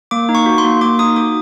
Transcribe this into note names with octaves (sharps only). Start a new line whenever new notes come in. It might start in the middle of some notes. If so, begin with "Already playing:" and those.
A#3 D6
D#4
C#6
F#4
C6
A#3
A#3 D6
D#4 D#6
F#4 D6